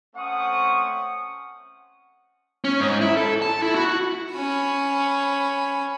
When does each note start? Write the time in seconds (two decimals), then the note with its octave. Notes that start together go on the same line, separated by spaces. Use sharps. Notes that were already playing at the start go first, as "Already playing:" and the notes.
0.16 A3 C4 C#4 F#5 C#6 D#6
2.64 C#4
2.80 G#2
3.01 E4
3.17 A4
3.42 A5
3.62 E4
3.75 F#4
4.33 C#4 B5